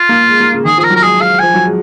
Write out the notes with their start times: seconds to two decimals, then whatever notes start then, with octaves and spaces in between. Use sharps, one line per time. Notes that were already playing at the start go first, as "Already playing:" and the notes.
Already playing: F4
0.09 A#3
0.28 G#3
0.40 A#3
0.53 C#3
0.65 D#3 G#4
0.78 F3 G#4
0.84 A#4
0.90 F#3
0.96 A#4
1.02 G#3 G#4
1.21 F5
1.39 F3 G#5
1.54 F#3
1.64 G#3